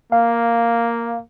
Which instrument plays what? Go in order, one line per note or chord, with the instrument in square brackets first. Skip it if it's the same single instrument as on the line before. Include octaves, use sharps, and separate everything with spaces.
[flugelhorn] A#3 [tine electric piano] F5